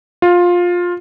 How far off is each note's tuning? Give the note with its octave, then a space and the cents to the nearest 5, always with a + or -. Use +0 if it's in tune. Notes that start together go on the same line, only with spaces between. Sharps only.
F4 +15